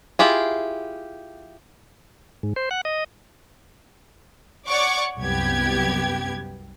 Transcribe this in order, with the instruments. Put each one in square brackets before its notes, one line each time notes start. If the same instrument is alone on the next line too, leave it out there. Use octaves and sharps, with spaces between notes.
[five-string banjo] E4 F4 G4 G#4
[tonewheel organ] G#2
C5
F#5
D#5
[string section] C#5 D5 F#5 C#6 D6
C2 F#2 B3 G4 G#6